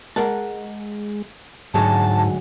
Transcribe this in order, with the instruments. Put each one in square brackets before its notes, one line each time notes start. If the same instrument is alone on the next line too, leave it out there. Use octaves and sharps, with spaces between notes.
[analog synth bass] G#3 [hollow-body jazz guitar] A#4 F#5 A5
[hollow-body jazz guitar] D2 F#3 G#3 [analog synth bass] G#2 [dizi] A5